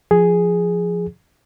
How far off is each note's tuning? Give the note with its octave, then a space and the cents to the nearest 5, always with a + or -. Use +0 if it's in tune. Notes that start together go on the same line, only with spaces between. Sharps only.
F3 +0 G#4 +0